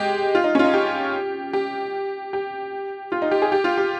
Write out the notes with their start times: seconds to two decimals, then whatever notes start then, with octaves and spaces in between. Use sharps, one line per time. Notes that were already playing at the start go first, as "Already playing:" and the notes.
Already playing: G#3 G4
0.35 F4
0.44 D#4
0.55 C#4
0.59 F4
0.64 D#4
0.74 G4
1.53 G4
2.33 G4
3.12 F4
3.22 D#4
3.31 G4
3.42 G#4
3.52 G4
3.64 F4
3.78 G4